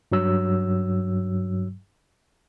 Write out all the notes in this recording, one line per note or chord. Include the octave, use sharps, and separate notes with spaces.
G2 F#3 E6